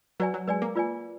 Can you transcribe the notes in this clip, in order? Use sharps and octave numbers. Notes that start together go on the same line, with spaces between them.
F#3 B4 D5 G#5
F#3
G#3 B4 D5 G#5
A#3
F4 B4 D5 G#5